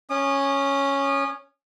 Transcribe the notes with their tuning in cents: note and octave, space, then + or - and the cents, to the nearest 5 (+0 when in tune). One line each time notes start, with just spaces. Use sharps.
C#4 +0 D#6 -40